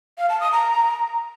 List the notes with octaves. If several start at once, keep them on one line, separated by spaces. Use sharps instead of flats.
F5
A5
D#6
A#5